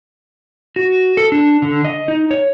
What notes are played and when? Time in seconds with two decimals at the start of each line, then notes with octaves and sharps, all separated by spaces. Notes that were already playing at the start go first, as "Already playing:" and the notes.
0.76 F#4
1.17 A4
1.32 D4
1.62 D3
1.85 D#5
2.08 D#4
2.31 C#5